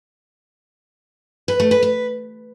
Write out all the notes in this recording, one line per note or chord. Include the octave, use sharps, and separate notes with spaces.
B4
A3
B4
B4